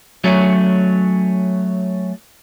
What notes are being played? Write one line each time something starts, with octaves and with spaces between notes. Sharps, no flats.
F#3 A3 C#4